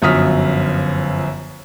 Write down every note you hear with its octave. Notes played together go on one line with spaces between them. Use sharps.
G1 F#2 F3 D#6 F6 B6